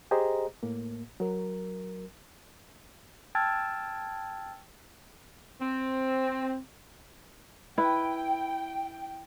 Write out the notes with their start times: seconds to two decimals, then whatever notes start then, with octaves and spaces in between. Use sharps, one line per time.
0.11 G4 G#4 C5 D#5 A#5
0.63 A2 A#3
1.20 F#3 A#4
3.35 G5 A5 E6 F6 G#6 A6
5.60 C4
7.78 E4 B4 G5